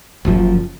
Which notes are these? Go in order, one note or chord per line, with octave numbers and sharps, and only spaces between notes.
F#1 F#2 F3